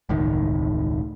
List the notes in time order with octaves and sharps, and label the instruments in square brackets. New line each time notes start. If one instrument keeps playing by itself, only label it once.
[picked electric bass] E1 C#2 A2 D#3